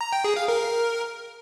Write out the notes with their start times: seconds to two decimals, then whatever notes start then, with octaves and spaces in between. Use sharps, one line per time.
0.01 A#5
0.13 G5
0.24 G#4
0.36 F5
0.48 A#4